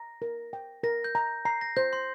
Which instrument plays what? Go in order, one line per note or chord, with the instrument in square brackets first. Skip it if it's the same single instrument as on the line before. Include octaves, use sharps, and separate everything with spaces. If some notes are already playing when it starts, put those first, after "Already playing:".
Already playing: [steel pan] A#5 [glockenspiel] A#6
[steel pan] A#4
G5
[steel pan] A#4 [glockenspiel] A#6
[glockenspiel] G6
[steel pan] A#5
[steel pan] A#5 [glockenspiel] C7
[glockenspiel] A#6
[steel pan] C5 [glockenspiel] G6
[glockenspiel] C6